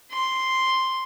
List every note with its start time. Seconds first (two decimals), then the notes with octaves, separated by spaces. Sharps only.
0.11 C6